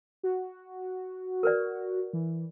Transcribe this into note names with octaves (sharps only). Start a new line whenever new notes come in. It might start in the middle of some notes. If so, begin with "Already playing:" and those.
F#4
A#4 B4 D5
E3